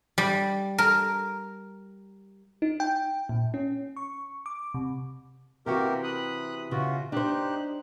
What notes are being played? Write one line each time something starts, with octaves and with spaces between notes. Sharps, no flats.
G3
A#4
D#4
G5
A#2
C#4
C#6
D6
C3
C3 E3 A#3 F#4 G4 A#4
B5 D#6 F#6
C#3 E3 F4 F#4
D4 D#4 G4 C5 F#6